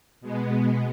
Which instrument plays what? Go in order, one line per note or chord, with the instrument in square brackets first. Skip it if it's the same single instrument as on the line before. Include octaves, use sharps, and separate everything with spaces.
[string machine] B2 G#3 B3